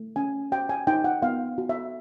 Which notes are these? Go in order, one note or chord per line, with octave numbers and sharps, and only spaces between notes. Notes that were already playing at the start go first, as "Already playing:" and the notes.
Already playing: A3
C#4 G#5
F#4 G5
G#5
D#4 G5
F#5
B3 F5
F#4
E5